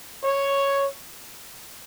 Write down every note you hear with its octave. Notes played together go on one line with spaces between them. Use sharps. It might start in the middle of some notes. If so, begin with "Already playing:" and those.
C#5